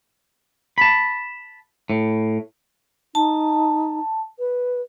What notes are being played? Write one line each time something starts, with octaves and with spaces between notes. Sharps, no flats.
A5 B5
A2
D#4 A5
B4